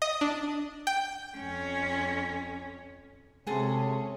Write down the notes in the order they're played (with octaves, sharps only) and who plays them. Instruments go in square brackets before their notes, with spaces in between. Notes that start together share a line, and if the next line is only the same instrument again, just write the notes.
[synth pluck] D#5
D4
G5
[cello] F2 C#4
[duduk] C3 [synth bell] G#3 C4 [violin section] C#4 [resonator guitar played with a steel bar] F#4 G#4 A4